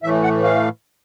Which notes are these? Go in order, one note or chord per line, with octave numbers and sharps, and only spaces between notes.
A2 E3 A3 E5
F#5
F5